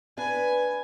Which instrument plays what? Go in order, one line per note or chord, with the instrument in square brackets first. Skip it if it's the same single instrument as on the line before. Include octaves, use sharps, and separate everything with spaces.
[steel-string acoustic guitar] D4 B4 [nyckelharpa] G#5